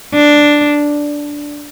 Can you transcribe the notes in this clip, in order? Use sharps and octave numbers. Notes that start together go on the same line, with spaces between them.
D4